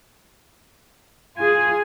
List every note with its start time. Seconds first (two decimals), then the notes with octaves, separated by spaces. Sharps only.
1.38 F4 G#4 G#5